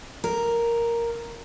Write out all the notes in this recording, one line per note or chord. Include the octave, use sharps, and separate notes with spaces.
A#4